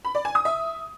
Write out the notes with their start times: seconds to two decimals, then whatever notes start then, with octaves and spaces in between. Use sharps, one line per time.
0.05 B5
0.15 D5
0.25 G#5
0.35 D#6
0.45 E5